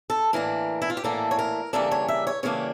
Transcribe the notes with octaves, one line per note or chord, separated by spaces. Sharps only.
A4
A2 E3 A#3 D4 A#4
E4
F4
G4
A2 E3 A#3 D4 A4
C#5
A#4
C#3 E3 G3 A#3 D4 A4
C#5
E5
C#5
C#3 E3 G3 A#3 D4 C#5